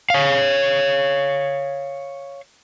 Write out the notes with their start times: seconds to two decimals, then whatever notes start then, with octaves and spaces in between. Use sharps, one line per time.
0.10 C#5 F5